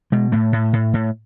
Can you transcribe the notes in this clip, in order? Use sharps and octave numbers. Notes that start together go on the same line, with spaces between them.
B2 G#3
A2 A3
A2
A2
A2